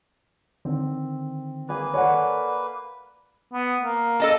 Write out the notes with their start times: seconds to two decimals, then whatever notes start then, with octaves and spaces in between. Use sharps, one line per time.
0.65 D3 D#3 C4
1.69 A#3 G#4 B4 G#5
1.94 A4 C#5 D5 F#5 G#5
3.54 B3
3.81 A#3
4.20 A4 D#5 A5